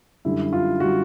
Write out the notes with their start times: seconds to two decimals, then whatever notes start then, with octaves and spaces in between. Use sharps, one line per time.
0.25 F#2 D3 G3 E4
0.53 F4
0.80 D3 G3 F#4